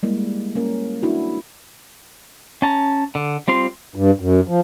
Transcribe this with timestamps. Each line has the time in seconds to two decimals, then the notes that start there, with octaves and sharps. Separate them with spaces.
0.03 G3 G#3 A#3 E4
0.55 A#3 C#4 A#4
1.03 D4 E4 F#4
2.62 C#4 A5 A#5
3.15 D3
3.48 G3 C4 F4 C6
3.96 G2
4.20 F#2
4.48 F3